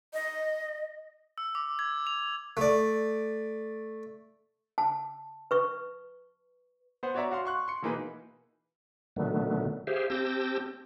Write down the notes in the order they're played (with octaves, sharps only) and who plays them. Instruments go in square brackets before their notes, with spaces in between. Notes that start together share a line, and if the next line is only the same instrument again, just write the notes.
[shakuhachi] D#5
[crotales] E6
D6
G#6
F7
[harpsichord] A3 D5
[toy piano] A5
B4 C#6
[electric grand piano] B3 C5 F#5
F#4 C#5 D5 E5 A#5
F#4 F5 C6
C6 C#6 F#6
C6 C#7
B2 E3 A#3 D#4 G#4 B4
[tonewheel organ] A#2 D3 D#3 F#3 A3 B3
G4 G#4 C5 E5 F5
C4 G4 A5 E6 G6 A#6